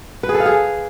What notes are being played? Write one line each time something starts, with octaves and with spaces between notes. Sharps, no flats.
B4
G#4
A4
F5
G#4